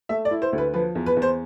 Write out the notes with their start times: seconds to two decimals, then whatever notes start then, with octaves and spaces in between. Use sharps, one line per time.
0.09 A3 E5
0.25 D5
0.31 E4
0.42 C5
0.53 D2
0.58 B4
0.74 F3 B4
0.95 E2
1.06 B4
1.17 E2
1.22 C5